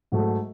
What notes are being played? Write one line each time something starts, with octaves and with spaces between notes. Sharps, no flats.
G#2 F#3 A3